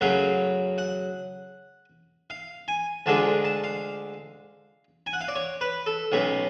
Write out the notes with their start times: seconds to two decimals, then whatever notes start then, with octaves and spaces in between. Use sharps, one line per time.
0.01 F#2 C#3 F#3 A3 F5
0.78 F#5
2.30 F5
2.68 G#5
3.06 D2 D3 G#3 D4 F4 A5
3.45 A5
3.64 F5
5.07 G#5
5.13 F#5
5.21 F5
5.28 D5
5.35 C#5
5.61 B4
5.86 A4
6.12 B1 B2 A3 C#4